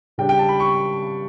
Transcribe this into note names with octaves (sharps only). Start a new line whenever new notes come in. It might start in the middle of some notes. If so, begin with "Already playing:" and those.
C#3 G3 D4 G5
G5
A5
B5
C#6